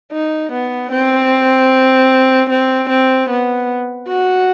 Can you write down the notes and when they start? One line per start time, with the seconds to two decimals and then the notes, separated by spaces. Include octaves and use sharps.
0.12 D#4
0.52 B3
0.92 C4
2.50 C4
2.89 C4
3.30 B3
4.08 F#4